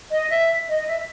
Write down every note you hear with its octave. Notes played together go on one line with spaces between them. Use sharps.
D#5
E5
D#5
E5